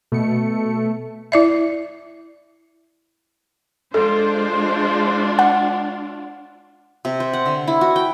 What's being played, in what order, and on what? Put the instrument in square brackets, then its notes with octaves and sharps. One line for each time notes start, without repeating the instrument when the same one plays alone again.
[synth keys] B2 C#7 [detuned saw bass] A3
[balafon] E4 D5 E5
[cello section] G#3 C5 [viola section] D4 F4 [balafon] A4
[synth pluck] F#5
[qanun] C3
C5
F#5
D3
E4
F#4
G5